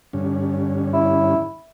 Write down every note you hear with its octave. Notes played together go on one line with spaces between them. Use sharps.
G2 D3 C#4
E4